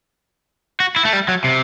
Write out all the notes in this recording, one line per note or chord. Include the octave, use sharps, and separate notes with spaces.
F#4
E4
A3
G3
F#3
C3